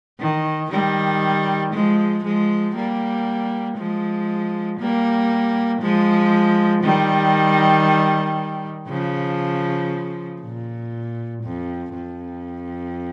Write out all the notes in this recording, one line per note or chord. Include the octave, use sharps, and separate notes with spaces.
D#3
D#3 G3
F3 G#3
F3 G#3
G3 A#3
F3 G#3
G3 A#3
F3 G#3
D#3 G3
C#3 F3
A#2
F2
F2